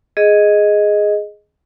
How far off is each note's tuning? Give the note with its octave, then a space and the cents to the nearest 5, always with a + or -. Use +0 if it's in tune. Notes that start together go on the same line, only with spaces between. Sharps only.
G#4 +0 D#5 +0